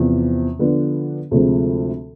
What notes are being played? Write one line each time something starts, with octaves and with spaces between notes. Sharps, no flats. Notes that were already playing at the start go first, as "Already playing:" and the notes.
Already playing: E2 C3 F3
D3 F3 B3 D4
D2 C3 F3 G#3 C4